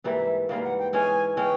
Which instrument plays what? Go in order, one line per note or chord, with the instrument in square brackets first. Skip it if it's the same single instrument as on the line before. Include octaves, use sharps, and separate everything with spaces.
[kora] G#2 E3 G3 A#3 [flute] E5
[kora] G#2 E3 G3 A#3 [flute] F5
[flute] F#5
G5
[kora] E3 G#3 C#4 [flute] G#5
[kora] E3 G#3 C#4 [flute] G5